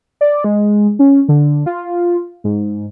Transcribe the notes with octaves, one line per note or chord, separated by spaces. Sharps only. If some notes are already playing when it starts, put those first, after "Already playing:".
D5
G#3
C#4
D3
F4
G#2